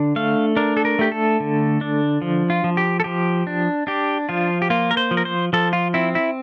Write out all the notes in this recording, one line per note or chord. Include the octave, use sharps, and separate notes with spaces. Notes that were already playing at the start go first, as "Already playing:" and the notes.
Already playing: D3 D4
A3 F5
D4 A#4
A4
A#4
A3 G4
A4
D3
D4
F3
F4
F3
G4
A4
F3 G4
D4
D4 G4
F3 F4
G4
A#3 F4
A#4
C5
F3
A#4
C5
F3 A4
F4
C4 E4
E4